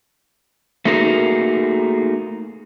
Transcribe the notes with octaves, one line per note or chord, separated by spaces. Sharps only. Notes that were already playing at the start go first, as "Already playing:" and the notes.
A3 A#3 D#4 F#4 G#4 A#4